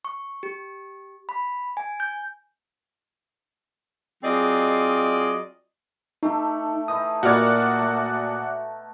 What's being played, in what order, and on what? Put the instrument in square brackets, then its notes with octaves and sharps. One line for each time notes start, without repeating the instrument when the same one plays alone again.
[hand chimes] C#6
G4
B5
G#5
G6
[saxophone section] F#3 C4 F4 G#4 D5 D#5
[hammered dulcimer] A3 G4 A4 [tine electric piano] D#4
[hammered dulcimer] E3 D#4 E4 [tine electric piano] D#6
[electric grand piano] A#2 F6 G#6 [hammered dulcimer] D#3 B3 [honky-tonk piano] F#4 D5
[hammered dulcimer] A3 A5